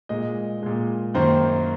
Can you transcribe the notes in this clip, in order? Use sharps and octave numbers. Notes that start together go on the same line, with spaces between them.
A#2 G#3 D#5
A#2 G#3
F#2 D#3 A#3 C5